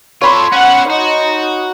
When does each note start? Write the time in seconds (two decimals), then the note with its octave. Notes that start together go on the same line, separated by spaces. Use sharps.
0.22 F4 A4 C#5 B5 C6
0.53 C#4 C5 F#5
0.90 D#4 F#4